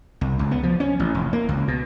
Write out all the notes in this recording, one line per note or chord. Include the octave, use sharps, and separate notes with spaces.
C2
C#2
B3
F3
C#4
A1
F1
A#3
C#2
B2